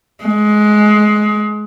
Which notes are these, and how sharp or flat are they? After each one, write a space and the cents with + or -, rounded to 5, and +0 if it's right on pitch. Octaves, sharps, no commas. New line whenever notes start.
G#3 +20